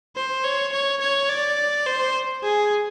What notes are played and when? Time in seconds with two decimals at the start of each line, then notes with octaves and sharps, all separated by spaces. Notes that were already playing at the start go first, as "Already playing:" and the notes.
0.16 C5
0.44 C#5
0.72 C#5
1.01 C#5
1.29 D5
1.86 C5
2.43 G#4